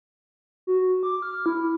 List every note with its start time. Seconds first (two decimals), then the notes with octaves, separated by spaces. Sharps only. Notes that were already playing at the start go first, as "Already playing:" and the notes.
0.67 F#4
1.03 D6
1.22 F6
1.46 E4